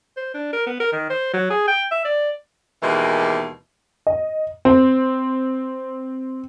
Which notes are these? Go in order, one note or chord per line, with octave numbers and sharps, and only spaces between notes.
C5
D4
A#4
B3
A#4
D#3
C5
F#3
G#4
G5
E5
D5
D#2 B2 E3 G#3 A#3
D#5
C4